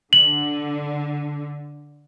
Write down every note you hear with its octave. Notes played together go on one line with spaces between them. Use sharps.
D3 F#7